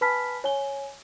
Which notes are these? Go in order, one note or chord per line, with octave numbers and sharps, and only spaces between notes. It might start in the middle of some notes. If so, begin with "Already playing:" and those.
B4 G#5 A5 B5 F6 B6
C#5 G#5 G7